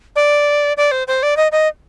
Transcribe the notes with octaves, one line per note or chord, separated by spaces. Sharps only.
D5
D5
C5
C5
D5
D#5
D#5